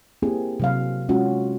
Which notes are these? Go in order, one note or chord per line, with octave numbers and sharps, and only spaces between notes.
A#3 C4 E4 G4 G#4
C3 F#3 F5
G#3 C#4 F4 F#4